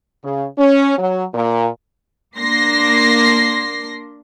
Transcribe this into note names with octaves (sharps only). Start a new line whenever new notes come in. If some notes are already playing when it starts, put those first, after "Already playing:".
C#3
C#4
F#3
A#2
A#3 D4 C6 A#6 C7